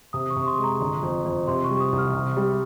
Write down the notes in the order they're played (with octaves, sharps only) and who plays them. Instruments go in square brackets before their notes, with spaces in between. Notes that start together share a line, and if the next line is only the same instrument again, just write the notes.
[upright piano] C3 [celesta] D#6
[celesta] C#6
[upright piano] C3
[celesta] C6
[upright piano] G#3
[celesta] A#5
[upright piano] G1 [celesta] C6
[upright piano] F2
F2
[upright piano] C3 [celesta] C6
[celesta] C#6
[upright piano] G3
[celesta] D#6
[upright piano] C2
[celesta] F6
[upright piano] C3
G3